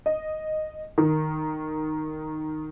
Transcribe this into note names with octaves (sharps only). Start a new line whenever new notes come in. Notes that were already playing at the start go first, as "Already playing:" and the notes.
D#5
D#3